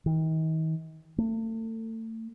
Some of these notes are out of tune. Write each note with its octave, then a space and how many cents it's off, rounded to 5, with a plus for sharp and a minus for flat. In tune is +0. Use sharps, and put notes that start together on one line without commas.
D#3 +40
A3 +35